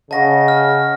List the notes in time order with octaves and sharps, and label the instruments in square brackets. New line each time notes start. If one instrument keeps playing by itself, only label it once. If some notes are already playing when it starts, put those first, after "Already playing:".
[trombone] C#3 [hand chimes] D#5 F#5 C#6 [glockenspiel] A5 A#6
[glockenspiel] F6